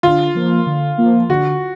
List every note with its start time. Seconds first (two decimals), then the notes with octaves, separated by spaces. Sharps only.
0.03 D3 F4
0.35 F3 A#3
0.67 D3
0.98 F3 A#3
1.29 D3 F#4